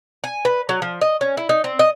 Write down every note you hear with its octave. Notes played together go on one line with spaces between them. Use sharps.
G#5
B4
F#3
F3
D#5
C#4
E4
D#4
C4
D#5